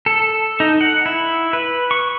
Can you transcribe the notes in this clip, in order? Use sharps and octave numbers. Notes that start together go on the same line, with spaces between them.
A4
D#4
F#5
E4
B4
C#6